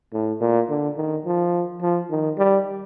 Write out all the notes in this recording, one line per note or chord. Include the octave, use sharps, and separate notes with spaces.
A2
A#2
D3
D#3
F3
F3
D#3
G3